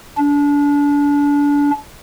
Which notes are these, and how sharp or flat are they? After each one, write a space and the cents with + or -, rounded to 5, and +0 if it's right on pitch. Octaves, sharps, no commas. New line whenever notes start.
D4 -30